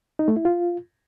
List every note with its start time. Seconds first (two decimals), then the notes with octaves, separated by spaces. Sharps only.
0.19 D#4
0.28 A3
0.37 E4
0.45 F4